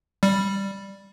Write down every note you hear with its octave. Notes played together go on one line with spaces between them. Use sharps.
G3